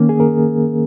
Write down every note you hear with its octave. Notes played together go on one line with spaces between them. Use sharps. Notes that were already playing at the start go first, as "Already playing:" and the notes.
Already playing: D#3 A#3 C#4
G#4
A#4